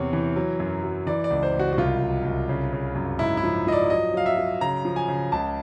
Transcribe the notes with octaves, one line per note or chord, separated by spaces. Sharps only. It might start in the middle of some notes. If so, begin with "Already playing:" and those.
Already playing: E2 C3 C#5
E3
F#3
F#2
F#3
E3 D5
D5
C#2
C5
C#2
F#4
F#4
C2 F4
F#3
C2
C#3
C#3
F#2
G#2 E4
E4
F3
F3 D#5
D5
F#3 D#5
F#3 F5
E5
F#3
C#3 A#5
F3
G#5
C#3
C#2 A5